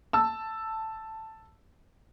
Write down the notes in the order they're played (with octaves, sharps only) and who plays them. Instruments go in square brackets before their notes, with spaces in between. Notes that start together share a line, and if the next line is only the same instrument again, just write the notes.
[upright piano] A5 E6